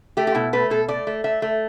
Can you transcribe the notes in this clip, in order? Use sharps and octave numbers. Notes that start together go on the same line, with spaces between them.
A3 G4
G4
B2 E4
A3 B4
B2 A4
A3 D5
A3
A3 E5
A3